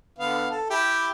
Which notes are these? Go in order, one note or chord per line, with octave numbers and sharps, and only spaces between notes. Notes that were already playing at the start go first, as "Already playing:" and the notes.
D3 B3 F5
A4
E4 G4